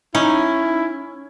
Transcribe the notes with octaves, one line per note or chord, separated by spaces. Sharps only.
C#4 D#4 E4